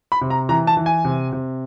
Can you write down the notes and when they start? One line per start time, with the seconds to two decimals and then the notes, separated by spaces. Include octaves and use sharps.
0.12 B5
0.21 C3
0.30 A#5
0.49 E3 A#5
0.67 A5
0.77 E3
0.86 G#5
1.05 C3
1.32 C3